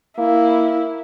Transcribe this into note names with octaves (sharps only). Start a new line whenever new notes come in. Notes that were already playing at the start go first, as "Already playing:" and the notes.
A#3 E4